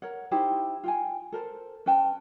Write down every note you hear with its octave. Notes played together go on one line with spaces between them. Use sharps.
A#4 C#5 F#5
D#4 E4 G4 C5
F4 G5 G#5
A4 A#4 C5
C#4 B4 G5 A5